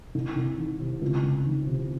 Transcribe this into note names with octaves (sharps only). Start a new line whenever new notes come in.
C2
C2
D#3
C3
C#2
C#2
D#3
C3